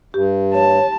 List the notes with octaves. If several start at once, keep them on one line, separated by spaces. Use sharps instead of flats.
G2 G4
C#5 A5